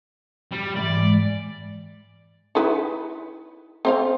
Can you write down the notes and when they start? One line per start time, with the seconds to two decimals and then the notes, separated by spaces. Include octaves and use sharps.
0.51 G3
0.76 G#2 E3 D5
0.96 G#3
2.55 D#4 E4 B4
3.85 C4 C5 F5